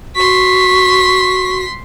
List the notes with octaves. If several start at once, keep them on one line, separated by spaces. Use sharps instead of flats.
F#4 C6 C#6 B6